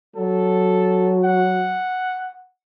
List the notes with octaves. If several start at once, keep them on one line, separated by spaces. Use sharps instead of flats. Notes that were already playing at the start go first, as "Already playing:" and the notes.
F#3 A4
F#5